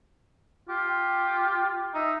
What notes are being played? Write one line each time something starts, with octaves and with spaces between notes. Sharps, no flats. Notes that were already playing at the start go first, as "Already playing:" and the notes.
F4 G4
D#4 E5